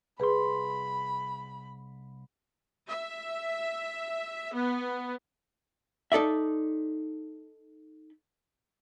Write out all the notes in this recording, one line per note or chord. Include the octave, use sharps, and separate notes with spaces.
C2 G#4 B4 B5 C6
E5
B3
D#4 A4 D5 E5